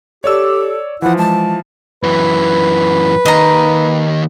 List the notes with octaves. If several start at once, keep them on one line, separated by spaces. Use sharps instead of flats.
G4 A4 C#5 D5 E6
E3 F3 E4 F#5
G#3 A5
F#2 E3 B4
D#2 D#3 D#5 A#5